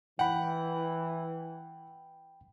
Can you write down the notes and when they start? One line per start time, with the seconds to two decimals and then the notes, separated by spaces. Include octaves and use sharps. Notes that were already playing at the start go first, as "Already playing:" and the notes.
0.19 E3 F#5 G5 B5